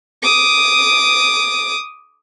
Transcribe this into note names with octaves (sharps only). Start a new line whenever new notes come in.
D6 D#6